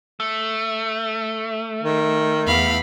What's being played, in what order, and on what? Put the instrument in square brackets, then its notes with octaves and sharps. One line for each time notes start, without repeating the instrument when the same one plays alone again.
[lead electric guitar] A3
[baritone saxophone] D#3
[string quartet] E2 F5 B5